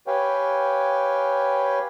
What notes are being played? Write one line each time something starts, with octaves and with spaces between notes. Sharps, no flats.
G4 B4 C#5 F5 G5 G#5